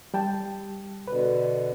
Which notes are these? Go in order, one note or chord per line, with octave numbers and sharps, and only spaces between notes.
G3 G5 A5
B2 D3 B4